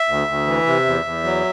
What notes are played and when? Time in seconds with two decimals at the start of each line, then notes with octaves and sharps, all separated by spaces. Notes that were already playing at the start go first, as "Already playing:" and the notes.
Already playing: E5
0.08 D2
0.28 D2
0.47 E3
0.66 C3
0.86 E2
1.05 E2
1.24 F#3